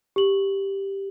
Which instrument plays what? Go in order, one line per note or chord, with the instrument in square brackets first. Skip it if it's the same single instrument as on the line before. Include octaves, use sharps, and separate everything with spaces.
[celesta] G4 F#7